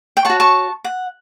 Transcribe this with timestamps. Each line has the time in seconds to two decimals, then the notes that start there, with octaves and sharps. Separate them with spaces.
0.17 G5
0.25 F#4 C#5 F#5 A5
0.40 A5 C#6
0.84 F#5